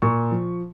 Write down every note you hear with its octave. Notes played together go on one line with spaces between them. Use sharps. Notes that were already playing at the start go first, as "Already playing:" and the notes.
A#2 C#6
F3